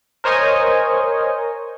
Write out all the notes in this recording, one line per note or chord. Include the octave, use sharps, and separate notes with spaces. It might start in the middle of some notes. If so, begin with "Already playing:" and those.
A#4 C5 C#5 D#5 G#5